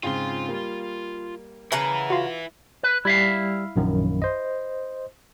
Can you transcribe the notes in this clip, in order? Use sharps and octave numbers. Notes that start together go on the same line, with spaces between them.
G#2 C#3 C4 F4 C6
G3 A#3
C#3 E4 B4 F#5 A#5
F4 F#4 A#6
B4
G3 E4 E5 F5
A#1 F#2 D#3
C5 D#5